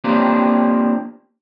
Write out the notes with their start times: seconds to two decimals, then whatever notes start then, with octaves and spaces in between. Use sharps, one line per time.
0.04 A#3 C4 D4 F4 G4 A#4